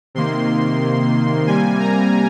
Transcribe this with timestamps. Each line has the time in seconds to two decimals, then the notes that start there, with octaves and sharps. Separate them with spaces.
0.15 C3 D#3 A#3 C6
1.46 C3 G3 A#3 G#5
1.80 A#5